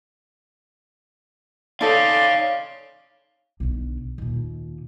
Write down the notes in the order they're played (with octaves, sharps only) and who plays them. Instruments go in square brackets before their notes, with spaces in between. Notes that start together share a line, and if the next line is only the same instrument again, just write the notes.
[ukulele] D#4 A4 [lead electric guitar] C#5 F5 [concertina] D5 C6
[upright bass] B1 D3
D#2 A#2